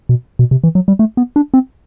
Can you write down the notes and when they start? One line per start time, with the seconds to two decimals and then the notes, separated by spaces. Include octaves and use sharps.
0.09 B2
0.39 B2
0.51 C3
0.64 E3
0.75 F#3
0.88 G3
0.99 A3
1.17 B3
1.36 D4
1.54 C4